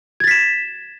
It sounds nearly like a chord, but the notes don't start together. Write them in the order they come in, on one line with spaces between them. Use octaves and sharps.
G#6 A6 B6 E7